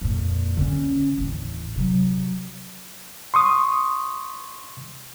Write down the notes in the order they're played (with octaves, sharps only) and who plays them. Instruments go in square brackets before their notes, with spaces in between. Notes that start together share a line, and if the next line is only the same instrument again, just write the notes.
[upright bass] F2 A#2
D3 C#4
A1 D#2
C3 F#3
[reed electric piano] C6 C#6 D#6